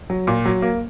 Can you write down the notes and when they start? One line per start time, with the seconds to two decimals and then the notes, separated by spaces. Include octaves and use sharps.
0.10 F#3
0.27 A#2
0.46 F#3
0.62 A#3